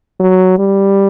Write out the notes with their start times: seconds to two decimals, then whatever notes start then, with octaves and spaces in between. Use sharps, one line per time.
0.20 F#3
0.58 G3